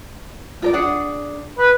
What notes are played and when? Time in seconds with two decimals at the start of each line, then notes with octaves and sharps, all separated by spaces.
0.62 F4 A#4 D5
0.73 D4 G#4 F#5
1.59 B4